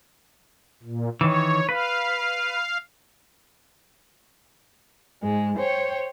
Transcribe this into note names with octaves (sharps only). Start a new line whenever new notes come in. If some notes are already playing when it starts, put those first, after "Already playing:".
A#2
D#3 E3 C#5
B4 F5
G#2 G#3
C5 C#5 G5